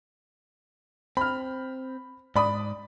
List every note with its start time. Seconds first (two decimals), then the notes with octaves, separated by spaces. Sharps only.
1.17 C4 B5 F6
2.36 G#2 D5 B5 D#6